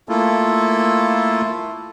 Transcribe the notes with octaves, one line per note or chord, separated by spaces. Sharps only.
A3 A#3 E4 F4 A4